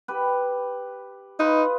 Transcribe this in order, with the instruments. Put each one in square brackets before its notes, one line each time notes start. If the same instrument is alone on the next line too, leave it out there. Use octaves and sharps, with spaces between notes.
[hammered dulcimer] G4 B4
[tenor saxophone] D#4 [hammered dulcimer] F4 B4 D#5